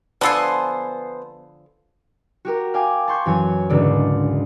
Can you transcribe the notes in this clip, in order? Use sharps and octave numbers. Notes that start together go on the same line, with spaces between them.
D3 F3 B3 A4 C5 G#5
F#4 G4 A#4
F5 G5 G#5 D6
A5 C6 C#6 G6 G#6
F#2 E3 C#5 G#5
E1 C#2 G#2 D3 A4 D5